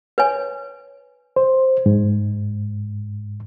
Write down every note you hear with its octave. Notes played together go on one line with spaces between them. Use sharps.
B4 C#5 G#5
C5
G#2